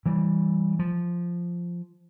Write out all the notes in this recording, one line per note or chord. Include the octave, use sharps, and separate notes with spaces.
E3 G3
F3